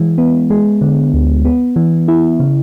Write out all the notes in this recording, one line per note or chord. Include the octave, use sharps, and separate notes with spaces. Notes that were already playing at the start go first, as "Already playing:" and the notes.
Already playing: E3 G#3
B3
G#3
D3
D2
B3
E3
E4
C#3